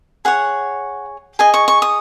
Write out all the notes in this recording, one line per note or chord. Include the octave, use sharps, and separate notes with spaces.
G#4 C#5 F#5
G#4 D#5 G#5
C#6
C#6
D#6